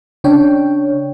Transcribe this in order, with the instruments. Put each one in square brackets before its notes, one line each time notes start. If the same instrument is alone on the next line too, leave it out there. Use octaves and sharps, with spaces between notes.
[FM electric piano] C#3 D4 C#5 G5